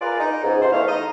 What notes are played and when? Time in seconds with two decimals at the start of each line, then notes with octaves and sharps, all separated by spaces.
0.01 F4 G#4 A#4 B4 D5 F5
0.20 D#4
0.43 C#2 G#2
0.60 F2 C3 C#4 C5 F#5 C6
0.72 E2 A3 F5
0.88 D#4 D#5